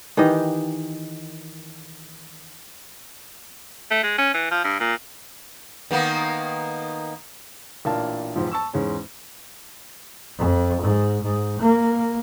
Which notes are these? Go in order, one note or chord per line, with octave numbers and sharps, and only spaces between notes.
D#3 E3 G4 D#5
A3
G#3
C#4
E3
F3
G2
A#2
D#3 A#3 B3
A1 A#2 D4 A#4 F5 A5
E1 G#2 F3
A5 C#6 E6
E2 G#2 G#3 C#4
F2
G#2
G#2
A#3